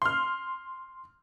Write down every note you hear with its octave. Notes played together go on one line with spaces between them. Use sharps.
C6 F6